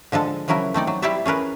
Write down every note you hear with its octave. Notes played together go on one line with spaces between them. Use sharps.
D3 F3 G#3 A4
C#3 F3 F#3 E4 A#4
A3 C4 D#4 D5
F#3
G3 E4 G4 C5 D5 E5
C#4 G#4 A#4 B4